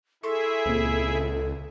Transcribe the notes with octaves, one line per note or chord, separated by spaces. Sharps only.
E4 G#4 A4 E5 C6 C#6
C#2 A#2 C4